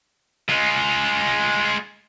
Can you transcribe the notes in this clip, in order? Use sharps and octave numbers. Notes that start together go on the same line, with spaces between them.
G#3 F4